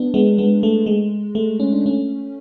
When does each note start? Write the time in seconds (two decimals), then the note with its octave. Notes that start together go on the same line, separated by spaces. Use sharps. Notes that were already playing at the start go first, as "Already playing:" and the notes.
Already playing: B3 D4
0.14 G#3 B3
0.38 G#3 B3
0.63 A3
0.86 G#3
1.35 A3
1.60 C#4
1.73 D4
1.86 A3 C#4